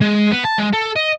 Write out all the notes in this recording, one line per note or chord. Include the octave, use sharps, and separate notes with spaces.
G#3
B3
A5
G#3
A4
D#5